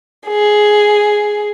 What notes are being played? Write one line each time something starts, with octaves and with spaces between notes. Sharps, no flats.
G#4